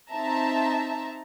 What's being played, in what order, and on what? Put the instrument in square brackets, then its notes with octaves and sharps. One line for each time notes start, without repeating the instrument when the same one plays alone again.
[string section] C4 D#4 E5 A5 A#5